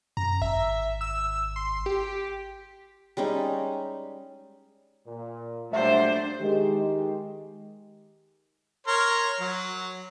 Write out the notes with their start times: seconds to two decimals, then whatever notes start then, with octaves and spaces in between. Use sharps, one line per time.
0.17 F#2 A#5
0.42 G#1 E5
1.01 E6
1.56 C6
1.86 G4
3.17 G3 G#3 C#4 D#4
5.06 A#2
5.73 A#2 F#3 G3 A3 D4 C5 E5
6.41 D#3 G#3 G4
8.87 A#4 C#5 C6
9.40 F#3